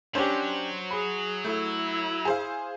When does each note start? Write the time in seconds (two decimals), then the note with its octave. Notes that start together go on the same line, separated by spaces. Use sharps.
0.15 F#3 C#4 D4 G4 C5
0.91 G#4 B5
1.44 A3 E4
2.25 G#4 C5 F5